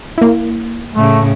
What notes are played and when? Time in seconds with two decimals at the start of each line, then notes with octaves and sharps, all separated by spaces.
0.18 A#3 E4
0.95 A2 C#3 A3